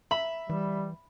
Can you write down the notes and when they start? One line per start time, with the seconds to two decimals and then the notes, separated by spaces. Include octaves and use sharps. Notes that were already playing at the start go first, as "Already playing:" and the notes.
0.11 E5 B5
0.50 E3 G3